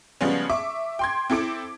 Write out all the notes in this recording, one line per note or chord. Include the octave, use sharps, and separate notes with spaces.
C#3 F3 G3 G#3 B3 C#4
E5 C#6 D6
G5 C6 G#6
C4 E4 A4 D6 D7